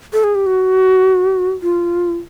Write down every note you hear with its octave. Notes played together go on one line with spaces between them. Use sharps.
A4
G#4
G4
F#4
F4